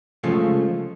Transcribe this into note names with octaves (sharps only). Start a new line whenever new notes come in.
C#3 F3 G#3 A3